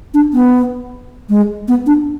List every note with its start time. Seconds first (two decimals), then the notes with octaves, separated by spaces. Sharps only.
0.14 D4
0.34 B3
1.29 G#3
1.68 B3
1.86 D4